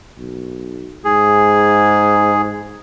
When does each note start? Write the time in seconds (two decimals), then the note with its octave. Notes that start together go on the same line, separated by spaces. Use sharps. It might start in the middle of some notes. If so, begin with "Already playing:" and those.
0.18 B1
1.05 G#2 G#4